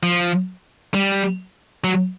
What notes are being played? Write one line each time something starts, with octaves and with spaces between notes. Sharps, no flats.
F3
G3
F#3